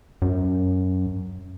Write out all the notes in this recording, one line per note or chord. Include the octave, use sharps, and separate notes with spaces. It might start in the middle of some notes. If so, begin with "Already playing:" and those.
F#2